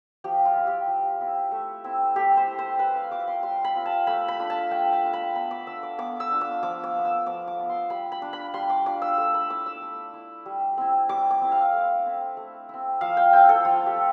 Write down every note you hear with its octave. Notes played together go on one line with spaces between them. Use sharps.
F3 G4
F4
C4 E4
G4
F3
C4 E4
A3
C4 E4
A3 G4
C5
C4 E4
C5
G3 B4
F5
C4 F4 D6
C6
G3 C6
B5
C4 F4
A5
A3 B5
B5
D4 F4
A5
A3 G5
A5
D4 F4
B5
B3 B5
D6
D4 F4 E6
D6
B3 D6
E6
D4 F4
D6
F3 D6
D6
B3 F4
E6
F3 D6
D6
B3 F4
C6
G3 B5
B5
D4 F4
B5
G3 C6
D6
D4 F4 D6
E6
A3 E6
B5
E4 D6
E6
A3
E4
G3
C4 E4
G3 D6
D6
C4 E4
F5
A3
C4 E4
A3
C4 E4
F3 F5
G5
A3 C4 E4 G5
A4
F3 F4
G4
A3